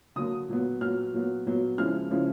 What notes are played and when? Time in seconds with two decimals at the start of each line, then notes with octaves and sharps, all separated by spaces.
0.16 D3 F#3 A#3 D#6
0.48 A#2 F#3 B3
0.81 A#2 F#3 B3 F6
1.13 A#2 F#3 B3
1.46 A#2 F#3 B3
1.78 C#3 F3 G#3 C#4 E4 F6
2.11 C#3 F3 G#3 C#4 E4